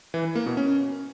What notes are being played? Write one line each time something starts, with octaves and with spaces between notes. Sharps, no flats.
E3
E4
A#3
B2
C#4